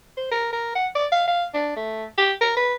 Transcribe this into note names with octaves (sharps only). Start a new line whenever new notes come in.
C5
A#4
A#4
F#5
D5
F5
F5
D4
A3
G4
A#4
B4